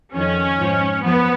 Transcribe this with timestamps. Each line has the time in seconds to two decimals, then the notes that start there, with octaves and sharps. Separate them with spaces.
0.15 F2 D#3 C#4
0.59 G#2 F3
1.02 F#2 F3 B3